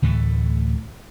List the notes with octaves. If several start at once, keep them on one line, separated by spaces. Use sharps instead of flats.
D2 A2 E3 A3